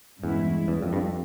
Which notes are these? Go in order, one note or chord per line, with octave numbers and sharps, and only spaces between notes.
E2 G2 E3 G#3 C#4 E4
E2
F2
G2
F2